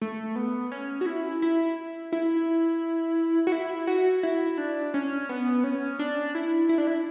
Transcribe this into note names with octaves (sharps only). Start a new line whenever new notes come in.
A3
B3
C#4
F#4
E4
E4
E4
F#4
E4
F#4
E4
D4
C#4
B3
C#4
D4
E4
E4
D4
E4